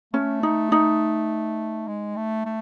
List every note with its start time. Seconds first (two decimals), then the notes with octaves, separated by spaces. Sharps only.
0.14 A3 C#4
0.43 D#4
0.72 D#4
1.87 G#3
2.16 A3
2.45 A3